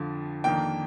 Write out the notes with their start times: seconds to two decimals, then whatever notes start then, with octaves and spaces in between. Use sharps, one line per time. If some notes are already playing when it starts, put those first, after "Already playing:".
Already playing: F2 D3 F3
0.44 F2 D#3 A#3 D4 G5